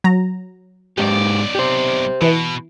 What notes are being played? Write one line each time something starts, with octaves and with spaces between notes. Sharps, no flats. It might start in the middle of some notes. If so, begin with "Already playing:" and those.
F#3 A#5
B1 G#2 G4 D5
G4 C5
B2 E3